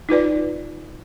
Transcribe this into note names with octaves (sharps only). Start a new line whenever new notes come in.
D#4 F4 B4 D5